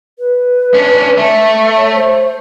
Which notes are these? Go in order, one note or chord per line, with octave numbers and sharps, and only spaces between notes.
B4
C#4 D4
A3
C#5
C5